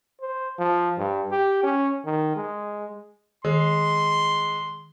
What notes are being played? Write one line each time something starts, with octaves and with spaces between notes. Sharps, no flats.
C5
F3
G2
G4
C#4
D#3
G#3
D#3 G#3 C6